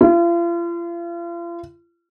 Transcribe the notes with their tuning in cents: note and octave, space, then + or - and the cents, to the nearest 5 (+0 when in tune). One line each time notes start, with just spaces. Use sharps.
F4 -40